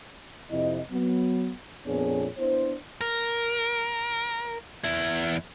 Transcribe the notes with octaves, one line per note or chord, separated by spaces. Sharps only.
F2 C3 C4 E4 D#5
F#3 B3
F2 A#2 B3 D4 G#4 C#5
B3 D4 E4 C5
A#4
E2 E4